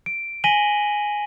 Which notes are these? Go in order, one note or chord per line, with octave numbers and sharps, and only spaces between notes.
D7
G#5 A#6 B6 D#7 F#7 G7